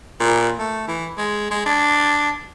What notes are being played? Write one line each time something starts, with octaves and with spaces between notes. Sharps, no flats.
A#2
A3
E3
G#3
G#3
D4